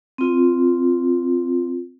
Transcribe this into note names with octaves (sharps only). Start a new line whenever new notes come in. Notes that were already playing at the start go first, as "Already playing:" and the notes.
C4 F4